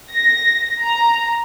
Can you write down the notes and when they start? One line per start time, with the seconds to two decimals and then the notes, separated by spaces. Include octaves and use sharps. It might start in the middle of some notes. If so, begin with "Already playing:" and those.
0.12 A#6
0.81 A#5